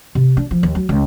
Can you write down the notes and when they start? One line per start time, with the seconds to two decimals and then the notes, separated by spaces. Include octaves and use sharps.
0.15 C3
0.37 D4
0.51 F3
0.63 D#2
0.75 F#3
0.89 C#2